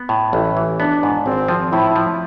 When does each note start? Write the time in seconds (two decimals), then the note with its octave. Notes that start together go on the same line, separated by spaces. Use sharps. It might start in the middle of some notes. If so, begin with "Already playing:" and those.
Already playing: B3
0.09 A2
0.33 A1 E4
0.57 E3
0.80 B3 D4
1.03 G#2
1.26 G#1 C4
1.48 F3
1.72 A2 E4
1.96 F3